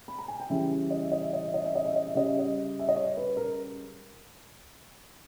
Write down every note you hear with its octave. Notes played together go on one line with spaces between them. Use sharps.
B5
A#5
G#5
G5
C#3 E3 G3 E5
D#5
E5
D#5
E5
D#5
E5
D#5
E5
D#5
E5
D#5
E5
C#3 G3 D#5
E5
D#5
E5
D#5
C#5
B4
A#4